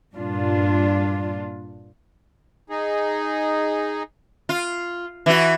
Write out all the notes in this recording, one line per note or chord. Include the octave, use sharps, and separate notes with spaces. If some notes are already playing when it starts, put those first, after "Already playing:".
G2 A#2 D4 F4
D#4 G#4
F4
E3 F#4